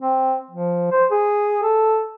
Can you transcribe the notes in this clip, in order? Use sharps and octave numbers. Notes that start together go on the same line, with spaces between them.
C4
F3
C5
G#4
A4